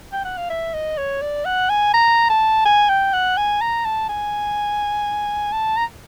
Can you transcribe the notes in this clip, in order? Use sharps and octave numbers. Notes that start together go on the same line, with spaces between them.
G5
F#5
F5
E5
D#5
C#5
D5
F#5
G#5
A#5
A5
G#5
G5
F#5
G#5
A#5
A5
G#5
A5
A#5